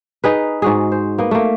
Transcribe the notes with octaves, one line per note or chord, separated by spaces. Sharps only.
D#4 G#4 B4
G#2 F#4 G#4
C5
A#3 B3
A3 A#3